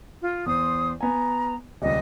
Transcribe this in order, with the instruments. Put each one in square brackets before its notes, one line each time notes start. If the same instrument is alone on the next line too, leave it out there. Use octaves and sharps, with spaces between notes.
[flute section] F4
[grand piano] E2 [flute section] C5 C6 D#6
[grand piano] B3 G#5 [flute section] A#5
[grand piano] D#1 C#2 [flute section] D#5